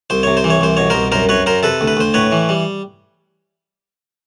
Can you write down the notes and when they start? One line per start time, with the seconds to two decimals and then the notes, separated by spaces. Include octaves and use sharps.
0.10 C2 C5
0.23 C3 C#5
0.37 C5
0.44 E3
0.50 C#5
0.61 C2 C5
0.77 B2 C#5
0.90 C2 A#4 C5
1.12 F#2 A#4 C5
1.29 F#2 B4 C#5
1.46 F#2 A#4 C5
1.63 C3 A4 B4
1.81 D2
1.87 B4
1.97 D2 C5
2.14 A2 B4 C#5
2.32 E3
2.49 G3